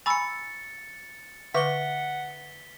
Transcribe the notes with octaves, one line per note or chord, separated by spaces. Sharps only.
G#5 A#5 B5 C#6 E6 A6 C#7
D3 B4 E5 F#5 C#6 D6 B6 G7